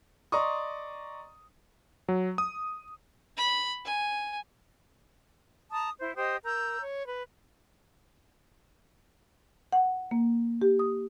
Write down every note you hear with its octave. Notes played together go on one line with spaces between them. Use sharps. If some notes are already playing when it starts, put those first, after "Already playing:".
D5 D#5 A#5 C6 C#6 D#6
F#3
D#6
B5
G#5
A5 A#5 D#6
E4 C5
G4 C5 D#5 D#6
A#4 A#5 E6 G6
C#5
B4
F#5
A#3
G4
D#6